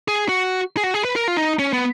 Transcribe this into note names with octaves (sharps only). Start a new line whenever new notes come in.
G#4
F#4
G#4
F#4
G#4
B4
A#4
F4
D#4
C#4
B3